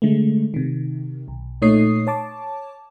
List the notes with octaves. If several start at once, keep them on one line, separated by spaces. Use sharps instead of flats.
D3 G#3 A3
C3 D#3
B1
A#2 A3 D#4 C#5 D#6 C7
C#5 A5 D6